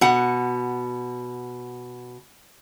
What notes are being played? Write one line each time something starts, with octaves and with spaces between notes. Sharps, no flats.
B2 F#5